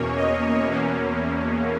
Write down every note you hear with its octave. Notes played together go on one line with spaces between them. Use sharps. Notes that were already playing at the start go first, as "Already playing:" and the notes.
Already playing: E2 B2 A#3 C#4 C#5
D#5
E2 B2 A#3 C#4